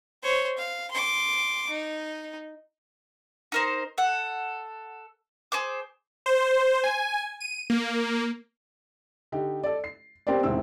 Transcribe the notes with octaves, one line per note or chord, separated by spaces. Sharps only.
C5 C#5
F5
C6 D6
D#4
D#4 A#4 C5
A4 F#5
G#4 C5 D6
C5
G#5
D#7
A#3
D3 D#4 G4
A4 D5
C7
B3 C4 G4 A#4 C5 D5
E1 A1 C3 D#3 C4 E6